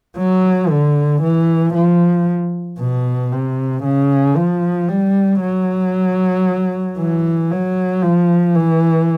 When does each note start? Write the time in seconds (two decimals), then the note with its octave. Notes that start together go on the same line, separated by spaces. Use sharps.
0.17 F#3
0.70 D3
1.22 E3
1.74 F3
2.80 B2
3.32 C3
3.84 C#3
4.37 F3
4.89 G3
5.41 F#3
6.99 E3
7.51 F#3
8.03 F3
8.55 E3